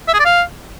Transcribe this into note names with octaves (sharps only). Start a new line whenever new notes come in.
E5
G#4
D5
F5